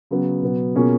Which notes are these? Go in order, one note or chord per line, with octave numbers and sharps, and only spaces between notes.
C#3 F#3 B3
B2 F#3 B3
B2 A#3 C#4 F4 G#4